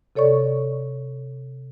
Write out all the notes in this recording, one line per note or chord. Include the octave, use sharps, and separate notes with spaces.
C3 A4 C#5 D5 C#6